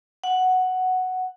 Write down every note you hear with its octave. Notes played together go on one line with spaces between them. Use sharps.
F#5